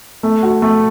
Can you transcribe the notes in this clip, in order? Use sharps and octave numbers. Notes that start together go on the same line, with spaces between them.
A3
F#4
A3